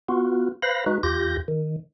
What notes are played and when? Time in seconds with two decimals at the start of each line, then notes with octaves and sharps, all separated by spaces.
0.09 B3 F4 F#4
0.62 B4 C5 F5 B5 A#6
0.86 G#3 D#4 F#4 B4
1.03 E2 F4 G4 G6 A#6
1.48 D#3